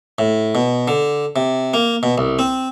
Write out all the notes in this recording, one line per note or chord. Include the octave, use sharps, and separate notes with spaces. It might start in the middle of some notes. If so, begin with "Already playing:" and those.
A2
B2
D3
C3
A#3
B2
C2
C4